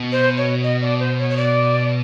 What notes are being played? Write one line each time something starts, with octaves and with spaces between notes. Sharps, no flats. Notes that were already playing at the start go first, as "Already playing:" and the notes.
Already playing: B2
C5
C#5
D#5
D5
C5
C#5
C#5
D5